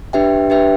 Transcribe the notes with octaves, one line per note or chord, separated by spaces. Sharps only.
D4 G4 B4 E5 G5
D4 G4 B4 E5 G5